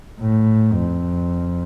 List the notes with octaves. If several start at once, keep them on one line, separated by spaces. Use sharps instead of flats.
A2
F2